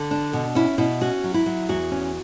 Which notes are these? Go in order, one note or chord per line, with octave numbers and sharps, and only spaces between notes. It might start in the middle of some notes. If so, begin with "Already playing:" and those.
Already playing: D3
D4
B2
C#4 E4
B2 E4
C#4 F#4
F#3
E4
F#3
E2 F#4
C#4